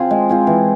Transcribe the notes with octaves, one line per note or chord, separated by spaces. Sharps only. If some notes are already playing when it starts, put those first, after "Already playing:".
Already playing: C4 F4 G#4
G#3
C4 F4 G#4
E3